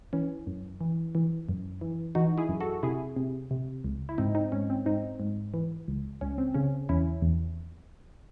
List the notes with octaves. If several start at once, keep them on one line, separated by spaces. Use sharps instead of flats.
E3 C#4
F#2
E3
E3
F#2
E3
E3 D#4 F#4
E4 G#4
F#2
F#4 A4
C3 E4 G#4
C3
C3
C#2
E4
G#2 C4 D#4
C4 D#4
G#2 C#4
C4
G#2 C4 D#4
G#2
E3
C#2
C#2 C#4
C4
C#3 C#4
E2 C#4 E4
E2